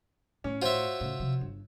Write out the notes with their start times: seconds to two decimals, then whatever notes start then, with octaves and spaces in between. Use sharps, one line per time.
0.44 A2 C#4
0.62 F4 F#4 C5 C#5 E5
1.00 A2 C#3
1.20 C3 F3
1.41 G1